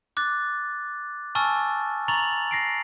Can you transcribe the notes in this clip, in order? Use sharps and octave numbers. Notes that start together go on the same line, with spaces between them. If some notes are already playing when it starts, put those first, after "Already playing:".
D6 F#6 A6
G#5 A5 C#6 E6 F6 A6
A#5 C#6 A6 F7 F#7
A#6 C7 D7